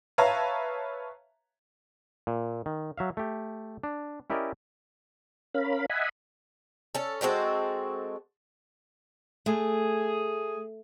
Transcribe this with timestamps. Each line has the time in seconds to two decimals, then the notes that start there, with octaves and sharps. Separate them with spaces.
0.18 B4 C#5 E5 F5 A5 A#5
2.27 A#2
2.66 D#3
2.98 F#3 E5 F5
3.17 A3 G4
3.83 D4
4.30 C#4 E4 G4 A#4 D5 D#5
5.54 C#4 A#4 F5 B5
5.90 D#5 E5 F#5 G#5 B5
6.95 C#4 A4
7.21 G#3 C4 F#4 A4
9.46 A3 G#4